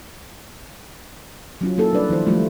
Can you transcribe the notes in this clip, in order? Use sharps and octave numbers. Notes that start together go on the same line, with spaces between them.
F#3 C#4 F4
A#3 E4 A4
G3 D4 B4 D5
D#3 F3 E4 C5
F3 G3 A3 A#3 F4